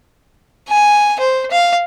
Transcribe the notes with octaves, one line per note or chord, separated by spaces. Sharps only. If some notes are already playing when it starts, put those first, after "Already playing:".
G#5
C5
F5